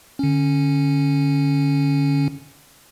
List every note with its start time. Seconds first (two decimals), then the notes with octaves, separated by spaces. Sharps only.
0.19 D3 C#4